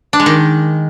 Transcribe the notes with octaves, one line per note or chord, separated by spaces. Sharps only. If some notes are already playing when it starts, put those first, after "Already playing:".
D4
G#3
D#3